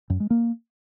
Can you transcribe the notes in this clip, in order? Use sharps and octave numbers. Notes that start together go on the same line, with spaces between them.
F#2
G#3
A#3